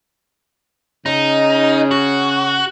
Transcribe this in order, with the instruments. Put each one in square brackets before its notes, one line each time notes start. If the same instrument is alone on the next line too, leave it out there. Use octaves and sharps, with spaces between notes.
[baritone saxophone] C#3 [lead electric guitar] D#4
[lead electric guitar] F#4